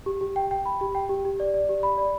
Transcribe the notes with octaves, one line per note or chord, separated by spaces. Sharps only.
G4
G4
G5
G5
B5
G4
G5
G4
G4
D5
D5
G4
B5
D5